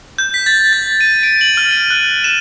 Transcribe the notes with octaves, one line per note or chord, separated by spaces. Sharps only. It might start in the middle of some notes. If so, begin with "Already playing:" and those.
G6
B6
A6
A6
D#7
D7
F#7
F6
D#7
F#6
E7